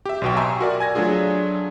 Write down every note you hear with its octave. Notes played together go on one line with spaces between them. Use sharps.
G4 E5
B1 B2 G5
E5 G#5 A#5 C6 C#6 E6
F#4 A#4 D5
G#5 G#6 A#6
F#3 A3 D4 F4 G#4